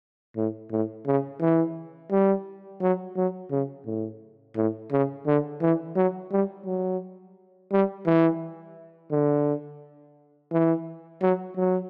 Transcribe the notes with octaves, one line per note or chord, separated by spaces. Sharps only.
A2
A2
C#3
E3
G3
F#3
F#3
C#3
A2
A2
C#3
D3
E3
F#3
G3
F#3
G3
E3
D3
E3
F#3
F#3